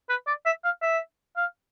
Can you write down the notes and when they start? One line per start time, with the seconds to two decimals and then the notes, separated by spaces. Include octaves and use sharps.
0.09 B4
0.27 D5
0.46 E5
0.64 F5
0.82 E5
1.37 F5